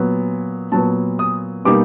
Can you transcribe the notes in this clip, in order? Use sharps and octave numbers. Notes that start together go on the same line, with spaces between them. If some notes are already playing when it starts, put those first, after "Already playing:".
Already playing: A#2 F#3 B3
A#2 F#3 B3 A5
D#6
B2 G3 A#3 D#4 D6